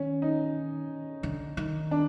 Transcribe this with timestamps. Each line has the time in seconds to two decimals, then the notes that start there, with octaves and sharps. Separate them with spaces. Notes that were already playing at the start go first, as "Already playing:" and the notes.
Already playing: D#3 C#4
0.22 D#4
1.23 D3
1.57 D#3
1.91 D4